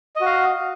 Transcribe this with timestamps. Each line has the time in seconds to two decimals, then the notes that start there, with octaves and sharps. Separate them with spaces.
0.16 D#5
0.21 F#4
0.26 F5